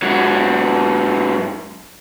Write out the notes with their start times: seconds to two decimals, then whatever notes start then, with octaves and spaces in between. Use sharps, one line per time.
0.02 G#2 F#3